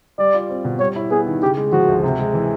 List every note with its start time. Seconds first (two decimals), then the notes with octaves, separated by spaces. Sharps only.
0.18 G3 D5
0.34 F4
0.50 C4
0.65 B2
0.80 G3 C#5
0.96 E4
1.11 B3 G#4
1.27 D#3
1.42 C#3 G4
1.57 G#3
1.72 F3 F#4
1.88 D2
2.03 C3
2.19 G#3
2.34 E3